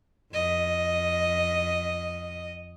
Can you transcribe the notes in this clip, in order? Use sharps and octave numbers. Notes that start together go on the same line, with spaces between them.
F2 D#5